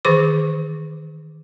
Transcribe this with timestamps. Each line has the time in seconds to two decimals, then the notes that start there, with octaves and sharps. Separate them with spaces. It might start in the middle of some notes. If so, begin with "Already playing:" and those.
0.05 D#3 E3 G#4 C5 D6